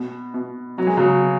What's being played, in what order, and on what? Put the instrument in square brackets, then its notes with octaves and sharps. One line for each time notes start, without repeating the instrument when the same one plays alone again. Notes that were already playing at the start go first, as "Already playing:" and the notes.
Already playing: [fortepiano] B2
B2
[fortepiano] B2 [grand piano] F#3
[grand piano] G#3
C#3 F#3
[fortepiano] B2